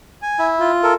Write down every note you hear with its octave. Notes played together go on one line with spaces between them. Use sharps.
G#5
E4
F4
A4 A#4